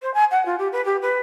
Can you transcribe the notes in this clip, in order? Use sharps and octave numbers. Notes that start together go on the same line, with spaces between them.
C5
G#5
F#5
F4
G4
B4
G4
B4